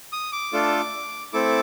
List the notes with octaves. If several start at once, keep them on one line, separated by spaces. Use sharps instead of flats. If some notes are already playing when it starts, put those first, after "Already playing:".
D#6
D6
A3 D4 F4 A4
A3 C4 E4 A4 D6